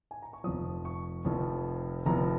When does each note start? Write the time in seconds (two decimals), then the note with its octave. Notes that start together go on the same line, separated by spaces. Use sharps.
0.11 G#5
0.22 A#5
0.33 C#6
0.44 F1 F2 F3 D#6
0.85 C#6
1.25 F1 F2 F3
2.06 F1 F2 F3 A#5